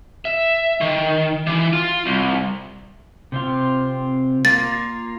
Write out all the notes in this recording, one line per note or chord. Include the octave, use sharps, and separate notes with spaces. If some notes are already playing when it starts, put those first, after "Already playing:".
E5
D#3
E3
F4
C2
C3 C4 F4
A#3 F4 A6